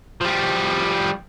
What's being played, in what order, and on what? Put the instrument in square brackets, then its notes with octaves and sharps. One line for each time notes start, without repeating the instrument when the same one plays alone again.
[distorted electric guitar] F3 G3